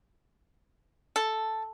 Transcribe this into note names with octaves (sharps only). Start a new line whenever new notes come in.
A4